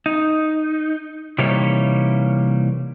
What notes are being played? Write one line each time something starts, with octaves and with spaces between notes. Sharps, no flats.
D#4
C3 E3 G3 A#3 D#4 C#5